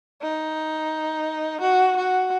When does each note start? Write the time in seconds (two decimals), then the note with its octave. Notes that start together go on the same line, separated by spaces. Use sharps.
0.22 D#4
1.61 F#4
1.97 F#4